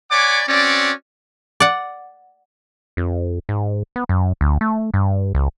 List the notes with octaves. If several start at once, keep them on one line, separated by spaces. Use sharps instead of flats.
C#5 D5 F#5 G#5 B5 D6
C4 C#4 F#4 D5
D5 F#5
F2
G#2
B3
F#2
D2
A3
G2
C#2